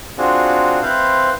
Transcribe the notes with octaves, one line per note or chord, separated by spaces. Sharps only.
C4 D4 F4 F#4 G#4
C4 E4 B4 C5 F5